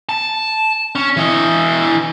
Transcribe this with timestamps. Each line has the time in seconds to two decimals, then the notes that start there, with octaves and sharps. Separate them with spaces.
0.09 A5
0.95 C#4
1.17 E3 D#5